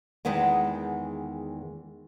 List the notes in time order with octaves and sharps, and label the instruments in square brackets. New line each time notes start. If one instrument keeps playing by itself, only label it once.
[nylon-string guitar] E2 D#3 G#3 B4 F#5 G5